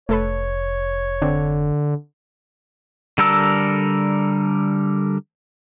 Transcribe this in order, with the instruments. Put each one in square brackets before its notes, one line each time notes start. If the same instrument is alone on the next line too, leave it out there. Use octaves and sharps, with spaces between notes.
[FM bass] F1 [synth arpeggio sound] A3 A4 B4 [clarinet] C#5
[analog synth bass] D3 [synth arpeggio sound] C4 D4
[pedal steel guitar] D3 G3 A4 A#4 E6